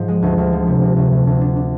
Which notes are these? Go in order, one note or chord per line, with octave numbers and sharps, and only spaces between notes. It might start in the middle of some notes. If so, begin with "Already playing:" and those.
Already playing: G#2 F3
G#3
D2
D2
F3
C3
D2
D2
D2
D2
D4
D4